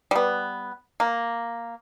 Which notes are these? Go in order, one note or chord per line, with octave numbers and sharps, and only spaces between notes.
G3 B3
A#3